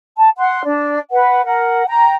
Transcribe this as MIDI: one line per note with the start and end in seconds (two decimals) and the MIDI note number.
0.18 0.30 81
0.37 0.61 78
0.37 0.61 84
0.64 0.98 62
1.10 1.45 71
1.10 1.45 78
1.46 1.86 70
1.46 1.86 78
1.87 2.16 79
1.87 2.16 82